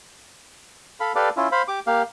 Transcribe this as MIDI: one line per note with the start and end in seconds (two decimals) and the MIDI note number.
1.00 1.12 69
1.00 1.12 77
1.00 1.12 83
1.15 1.29 67
1.15 1.29 69
1.15 1.29 71
1.15 1.29 74
1.15 1.29 77
1.37 1.48 61
1.37 1.48 64
1.37 1.48 65
1.52 1.62 72
1.52 1.62 77
1.52 1.62 83
1.68 1.80 67
1.68 1.80 86
1.87 2.03 58
1.87 2.03 67
1.87 2.03 77